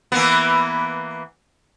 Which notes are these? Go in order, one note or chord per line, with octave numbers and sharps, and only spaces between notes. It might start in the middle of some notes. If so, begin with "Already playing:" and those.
E3 A#3 B3